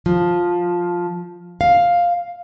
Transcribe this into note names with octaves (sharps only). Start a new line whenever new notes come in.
F3
F5